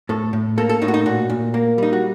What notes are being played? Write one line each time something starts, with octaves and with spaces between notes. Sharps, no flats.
A2 A4
A2
A#3 A4
A4
A2 D#4
F#4
D#4
A#2 F#4
A#2
A#3
G3 D#4
F#4